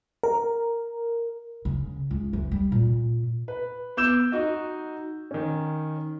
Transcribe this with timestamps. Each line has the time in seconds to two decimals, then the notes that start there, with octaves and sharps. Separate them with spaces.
0.23 A#4
1.65 C#3
2.11 C#2
2.33 E3
2.52 G3
2.72 A#2
3.48 B4
3.97 B3 D6 E6 G6 E7
4.32 D#4 F#4 D#5
5.31 D#3 C#4